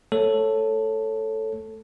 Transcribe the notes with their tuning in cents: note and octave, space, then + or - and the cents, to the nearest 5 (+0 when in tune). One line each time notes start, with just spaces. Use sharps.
A3 +0 A4 +5 C#5 -10